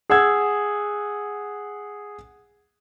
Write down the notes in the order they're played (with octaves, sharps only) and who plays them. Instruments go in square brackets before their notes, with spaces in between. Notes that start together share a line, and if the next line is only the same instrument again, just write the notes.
[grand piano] G#4 F#5 E6 G#6